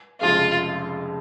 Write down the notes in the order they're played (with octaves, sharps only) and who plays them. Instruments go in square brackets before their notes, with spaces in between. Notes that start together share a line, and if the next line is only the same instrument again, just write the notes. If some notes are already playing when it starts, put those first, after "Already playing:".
[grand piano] F1 F2 C#3 F3 G#3 [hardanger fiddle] F4